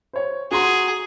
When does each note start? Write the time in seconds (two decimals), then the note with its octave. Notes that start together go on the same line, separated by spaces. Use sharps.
0.13 C5 C#5
0.51 F#4 G#4 A#5 C6